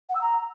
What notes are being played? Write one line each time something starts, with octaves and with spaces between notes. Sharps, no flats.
F#5
E6
A#5